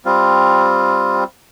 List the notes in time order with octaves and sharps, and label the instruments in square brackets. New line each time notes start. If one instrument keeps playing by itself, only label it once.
[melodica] G3 C4 F4